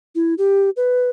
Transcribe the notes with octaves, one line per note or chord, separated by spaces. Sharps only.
E4
G4
B4